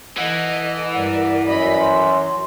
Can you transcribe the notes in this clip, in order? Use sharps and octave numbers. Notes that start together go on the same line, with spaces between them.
E3 A4 D#5 F#5
G2 A#4 D5 F#5
F#2 D5 D#5 B5
F#4 C6